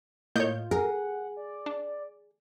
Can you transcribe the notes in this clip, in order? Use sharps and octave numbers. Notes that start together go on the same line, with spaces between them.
A2 A#3 F4 C#5 D#5 G6
G#4 A#4 F#5
D5
D4